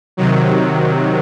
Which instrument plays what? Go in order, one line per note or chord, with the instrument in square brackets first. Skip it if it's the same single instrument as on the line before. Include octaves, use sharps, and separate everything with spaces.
[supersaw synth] C3 D#3 F#3